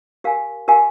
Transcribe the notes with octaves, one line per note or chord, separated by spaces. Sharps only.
G4 A#4 F5 G#5
G4 A#4 F5 G#5